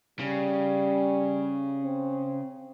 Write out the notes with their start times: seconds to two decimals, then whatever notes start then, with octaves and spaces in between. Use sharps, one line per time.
0.19 C#3 G3
1.84 C4